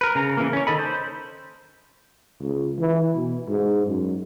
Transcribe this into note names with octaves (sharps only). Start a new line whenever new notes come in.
A#4 B4
C#3 A#5
C#3 E3 A#3
C#4 C#5
D#3 A4 D#5 B5
C5
C#2
E3
B2
G#2
F#2